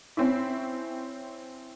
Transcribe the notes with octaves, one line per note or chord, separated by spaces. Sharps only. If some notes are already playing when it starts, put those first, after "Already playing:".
C4 C#4 E4